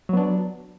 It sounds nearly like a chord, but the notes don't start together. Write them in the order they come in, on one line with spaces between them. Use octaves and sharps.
F#3 B3 D4